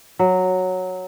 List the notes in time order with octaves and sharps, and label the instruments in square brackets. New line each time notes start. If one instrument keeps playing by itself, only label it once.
[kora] F#3